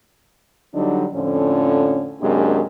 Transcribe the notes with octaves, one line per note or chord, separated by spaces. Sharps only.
D3 F#3 G3 D4 D#4
F2 A2 D3 F3 C#4
F#2 C3 G#3 A#3 D4 G4